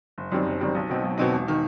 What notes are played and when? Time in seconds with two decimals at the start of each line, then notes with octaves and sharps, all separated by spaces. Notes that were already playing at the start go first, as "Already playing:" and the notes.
0.18 F#1
0.32 F#2 D#3 G3 C4
0.46 F#1
0.60 F#2 D#3 G3 C4
0.75 B1
0.90 B2 F#3 C4 D#4
1.04 B1
1.18 B2 F#3 C4 D#4
1.32 E1
1.48 D#3